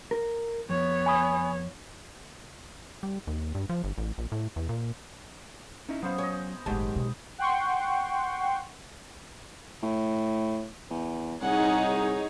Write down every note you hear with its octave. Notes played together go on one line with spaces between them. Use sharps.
A#4
F2 B3 C#5
G#5 B5 D#6
G3
D#2
G2
F3
G1
A1
A#1
A2
E2
A#2
C#4 D#4 E4
F#3 B3 C#4 C5 F5
C#5 D#5 G#5
G1 A2 D#3 F#3 G#3 G4 F#5 A5
B2
F#5 G5 C6 C#6
A2
E2
C2 D#4 G#4 C#5 F#5 G#5